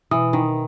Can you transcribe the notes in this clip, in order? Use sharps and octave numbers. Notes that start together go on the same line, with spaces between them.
B2 E3
D#3